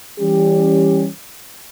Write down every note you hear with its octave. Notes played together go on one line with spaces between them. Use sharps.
E3 G3 C#4 G4